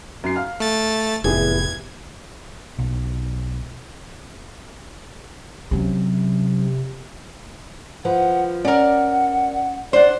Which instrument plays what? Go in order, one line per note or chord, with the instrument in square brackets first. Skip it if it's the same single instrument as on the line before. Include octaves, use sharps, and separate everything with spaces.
[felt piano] F#2 C7
F5 F6
[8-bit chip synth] A3 A6
[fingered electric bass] F1 [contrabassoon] E2 [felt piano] A2 G4 G#4 [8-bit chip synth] G#6
[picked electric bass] B1
[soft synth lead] C3 [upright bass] F#3 C#4
[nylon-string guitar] F3 B4 [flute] F#5
[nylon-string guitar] C#4 [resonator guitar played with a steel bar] A#4 D5 [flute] F#5
[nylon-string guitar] D4 F#5 [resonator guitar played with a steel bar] C5 [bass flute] D5